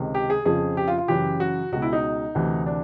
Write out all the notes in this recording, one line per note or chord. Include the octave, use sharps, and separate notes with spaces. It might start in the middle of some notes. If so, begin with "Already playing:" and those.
Already playing: C#2 C3 D#3
G4
G#4
F2 C#3 F3 G#4
G4
F4
F4
F#2 C#3 E3 G4
F#4
C#2 B2 F#4
E4
D#4
D2 C3 E3
D4